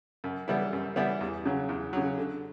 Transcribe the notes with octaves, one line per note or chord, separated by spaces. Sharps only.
F#2
E3 G3 B3 E4
F#2
E3 G3 B3 E4
E2
C#3 F#3
E2
C#3 F#3
D3